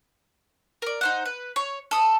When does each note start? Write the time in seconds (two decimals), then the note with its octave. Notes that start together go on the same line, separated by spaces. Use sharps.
0.82 A#4 D5
1.01 D#4 C5 F#5
1.25 B4
1.56 C#5
1.91 A4 D#6